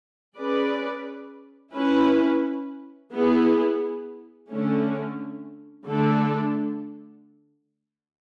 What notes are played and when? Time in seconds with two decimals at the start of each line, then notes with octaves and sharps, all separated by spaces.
0.37 C#4 G#4 B4 D5
1.74 C#4 E4 B4
3.12 B3 E4 G#4
4.49 D3 A3 C#4
5.86 D3 A3 D4 A4